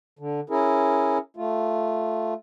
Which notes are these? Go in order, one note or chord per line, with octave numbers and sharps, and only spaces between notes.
D3
C#4 E4 G#4 A#4
A3 F4